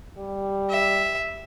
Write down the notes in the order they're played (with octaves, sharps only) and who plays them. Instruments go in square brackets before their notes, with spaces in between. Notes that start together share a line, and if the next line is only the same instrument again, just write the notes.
[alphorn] G3
[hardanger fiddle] E5